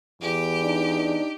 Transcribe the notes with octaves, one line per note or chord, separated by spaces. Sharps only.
E2 G4
D4 D#4